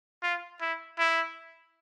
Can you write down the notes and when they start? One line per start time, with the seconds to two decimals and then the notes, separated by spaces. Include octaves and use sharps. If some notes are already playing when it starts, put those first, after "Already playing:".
0.23 F4
0.61 E4
0.99 E4